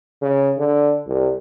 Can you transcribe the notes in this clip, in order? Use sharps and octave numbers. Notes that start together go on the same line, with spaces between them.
C#3
D3
C2